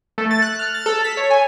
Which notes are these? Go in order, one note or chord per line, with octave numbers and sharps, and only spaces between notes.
A3
A6
F#6
F6
A6
A4
B6
C#5
G#5